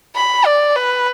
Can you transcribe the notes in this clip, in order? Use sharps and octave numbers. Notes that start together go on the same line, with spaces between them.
B5
D5
B4